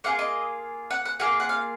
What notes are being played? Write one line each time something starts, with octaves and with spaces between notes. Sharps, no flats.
A#3 F4 G#4 F#5
D#5
F#5
F#5
A#3 F4 G#4 F#5
F#5
F5